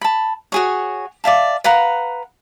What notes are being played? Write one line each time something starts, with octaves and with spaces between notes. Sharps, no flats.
A5 B5
F#4 G#4 C#5
D5 E5 F5 A5
B4 F5 F#5 A#5